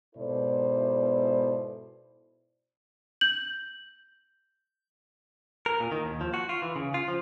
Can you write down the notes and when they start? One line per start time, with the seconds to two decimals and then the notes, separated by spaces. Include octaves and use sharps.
0.16 G#2 B2 E4 A4 C5 D5
3.21 G6 F#7
5.66 A#4
5.80 A#2
5.92 D#3
6.05 D#2
6.21 F3
6.34 F#4
6.49 F4
6.62 E3
6.76 C#3
6.94 F4
7.08 F3